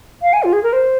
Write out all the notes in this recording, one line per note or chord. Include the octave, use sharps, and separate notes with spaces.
F5
G#5
F4
G#4
A#4
C5